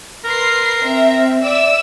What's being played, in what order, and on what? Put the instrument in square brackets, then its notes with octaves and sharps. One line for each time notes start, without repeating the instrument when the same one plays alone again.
[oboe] A#4 [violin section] B4 C6 C7
[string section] C4 [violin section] E5
[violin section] D5 E5 [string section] E6